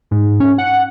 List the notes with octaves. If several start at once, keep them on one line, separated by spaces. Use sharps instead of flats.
G#2
C#4
F#5